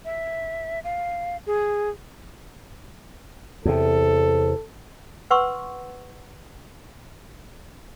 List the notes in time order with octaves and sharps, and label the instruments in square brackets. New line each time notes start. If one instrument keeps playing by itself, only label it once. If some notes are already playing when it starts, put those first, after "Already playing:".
[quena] E5
F5
G#4
[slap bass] E2 C3 [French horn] A4
[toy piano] B4 F#5 C6 C#6 E6